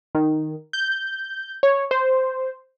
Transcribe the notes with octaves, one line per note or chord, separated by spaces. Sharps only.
D#3
G6
C#5
C5